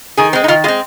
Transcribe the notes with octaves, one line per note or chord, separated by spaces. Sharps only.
D#3 G#4
G#3 C4
D#4
D#3 F4
G#3 C4 F4